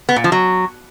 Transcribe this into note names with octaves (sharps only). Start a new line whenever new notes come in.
B3
A#2
F3
F#3